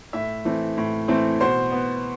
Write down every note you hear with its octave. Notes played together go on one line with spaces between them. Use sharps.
A2 E5
E3 A3 C4
A2
E3 A3 C4
B2 C5
B3